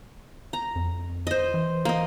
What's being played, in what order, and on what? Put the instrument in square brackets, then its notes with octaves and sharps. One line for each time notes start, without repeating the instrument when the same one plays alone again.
[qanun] A#5
[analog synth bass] F2
[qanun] C5 D#5
[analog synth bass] E3
[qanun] A#3 D#5